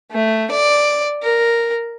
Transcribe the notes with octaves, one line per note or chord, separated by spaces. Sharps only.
A3
D5
A#4